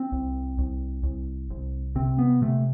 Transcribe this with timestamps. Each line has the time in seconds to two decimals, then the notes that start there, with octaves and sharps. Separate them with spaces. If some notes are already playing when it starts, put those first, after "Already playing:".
Already playing: C4
0.12 C2
0.58 C2
1.03 C2
1.50 C2
1.95 C3 C4
2.19 B3
2.42 C3 A3